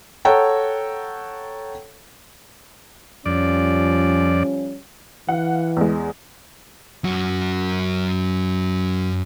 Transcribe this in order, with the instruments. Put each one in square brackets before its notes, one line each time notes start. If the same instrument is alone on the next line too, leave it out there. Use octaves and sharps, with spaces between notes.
[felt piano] A4 C#5 F#5 G5 A#5
[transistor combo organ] F2 D5 [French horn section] F3 G3 C#4
[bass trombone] E3 [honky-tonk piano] F5 F#5
[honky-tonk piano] E2 G#3
[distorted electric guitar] F#2 F#4